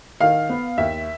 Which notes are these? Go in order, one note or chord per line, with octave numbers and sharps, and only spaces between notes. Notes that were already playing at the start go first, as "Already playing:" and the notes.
D#3 F5
B3
D#2 E5